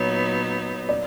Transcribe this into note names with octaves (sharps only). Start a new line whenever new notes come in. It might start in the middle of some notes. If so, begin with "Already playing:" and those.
Already playing: A#2 F#3 B3 D#4 C#5
D5